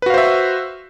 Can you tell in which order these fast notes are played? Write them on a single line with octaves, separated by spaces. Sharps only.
B4 F#4 F5 C5 E5